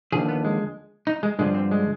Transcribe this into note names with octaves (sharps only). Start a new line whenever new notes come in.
D#2 D3 F3 G#4
B3
G#3
D#4
G#3
G2 D3 F3 G#3
C4
G#3